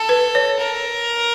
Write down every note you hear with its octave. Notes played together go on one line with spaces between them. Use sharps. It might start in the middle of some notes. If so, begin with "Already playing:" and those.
Already playing: A4
B4
C#5
A#4